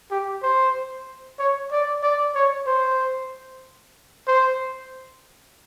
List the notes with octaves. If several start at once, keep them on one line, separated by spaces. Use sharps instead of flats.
G4
C5
C#5
D5
D5
C#5
C5
C5